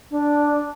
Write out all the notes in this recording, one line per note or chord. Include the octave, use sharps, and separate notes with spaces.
D4